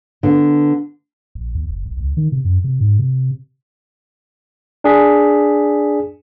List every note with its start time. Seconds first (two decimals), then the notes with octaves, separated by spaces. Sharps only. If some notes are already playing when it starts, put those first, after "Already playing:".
0.23 D3 B3
1.35 A#1
1.55 D#2
1.69 F#1
1.86 B1
1.99 C#2
2.17 D#3
2.32 C3
2.45 F#2
2.64 C3
2.81 G#2
2.99 C3
4.84 D4 G#4 B6